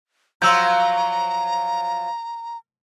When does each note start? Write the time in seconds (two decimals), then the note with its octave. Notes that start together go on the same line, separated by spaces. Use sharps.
0.42 F3 F#3 A#5 C6 E6 G6